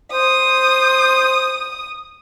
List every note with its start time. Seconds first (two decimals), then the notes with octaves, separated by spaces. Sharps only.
0.12 C5 D#6